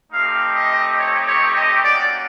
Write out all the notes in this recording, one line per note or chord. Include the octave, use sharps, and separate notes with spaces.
A3 C4 D#4 G4 F5
D#5
C#5
C#5
D#5
A#3 C#4 F#4 D5